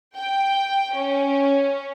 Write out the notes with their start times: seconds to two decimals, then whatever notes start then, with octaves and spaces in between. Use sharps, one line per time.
0.17 G5
0.94 C#4